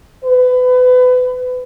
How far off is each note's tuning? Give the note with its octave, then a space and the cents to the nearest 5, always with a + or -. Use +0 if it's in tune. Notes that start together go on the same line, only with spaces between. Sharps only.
B4 +30